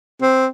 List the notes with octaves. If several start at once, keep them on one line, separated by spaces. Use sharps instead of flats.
C4